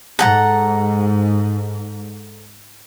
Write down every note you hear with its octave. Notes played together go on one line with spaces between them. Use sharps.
G#2 A4 F#5 A#5